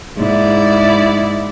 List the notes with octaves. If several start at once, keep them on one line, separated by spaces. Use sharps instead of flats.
G#2 E4 D5